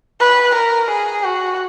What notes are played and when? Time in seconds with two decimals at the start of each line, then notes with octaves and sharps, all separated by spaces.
0.20 B4
0.55 A#4
0.91 G#4
1.25 F#4